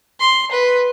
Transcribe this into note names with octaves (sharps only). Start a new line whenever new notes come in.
C6
B4